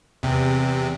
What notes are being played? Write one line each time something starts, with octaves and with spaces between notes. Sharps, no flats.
E2 C3